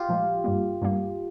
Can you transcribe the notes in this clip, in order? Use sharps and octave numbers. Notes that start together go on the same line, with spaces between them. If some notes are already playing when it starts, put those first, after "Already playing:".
Already playing: F4 G4
A#2 F3 G#3
G2 G3 A#3
G2 G3 A#3